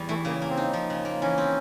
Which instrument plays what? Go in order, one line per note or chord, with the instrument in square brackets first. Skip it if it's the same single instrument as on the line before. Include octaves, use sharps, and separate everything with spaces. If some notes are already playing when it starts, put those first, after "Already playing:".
Already playing: [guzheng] E2 G3
[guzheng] E3 [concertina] A3
[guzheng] C#3 [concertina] A#3
[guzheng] A#3
[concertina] C4
[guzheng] D#4
F3
C#3
A#3
[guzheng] E3 [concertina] C#4
[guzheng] C4